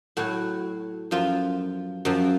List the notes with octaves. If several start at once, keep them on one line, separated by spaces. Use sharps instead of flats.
A2 F#3 F#4
F#2 F3 F4
F#2 F3